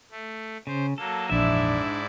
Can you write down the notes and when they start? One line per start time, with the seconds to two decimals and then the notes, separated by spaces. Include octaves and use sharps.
0.11 A3
0.67 C#3 C5
0.98 F#3 A#3 A4
1.30 A#1 F2 G#2 E3 D4 E4 D5 E5